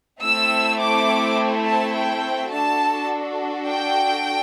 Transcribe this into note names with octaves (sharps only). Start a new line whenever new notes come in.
A3 C4 E4 A4 E6
D6
A5
G5
D4 F#4 A4 A5
G5